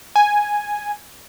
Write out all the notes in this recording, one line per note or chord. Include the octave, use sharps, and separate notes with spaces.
G#5